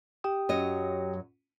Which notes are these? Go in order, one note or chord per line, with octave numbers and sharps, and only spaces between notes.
G4 G5 D#6
F#2 F#3 D#5